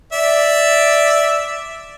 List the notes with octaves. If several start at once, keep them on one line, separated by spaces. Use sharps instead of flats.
D5 E5